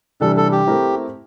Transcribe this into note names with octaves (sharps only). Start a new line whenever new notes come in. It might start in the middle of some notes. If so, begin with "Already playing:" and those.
C3 E3 G3 D4 A4
A4
G4
A3 C4 E4 A#4